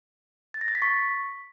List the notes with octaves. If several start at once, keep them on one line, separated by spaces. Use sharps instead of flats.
A6
A#6
A6
B6
C#6